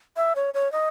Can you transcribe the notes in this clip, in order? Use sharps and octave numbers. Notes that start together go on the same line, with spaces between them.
E5
C#5
C#5
D#5